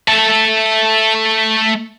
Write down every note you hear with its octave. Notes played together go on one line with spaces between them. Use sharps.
A3 A5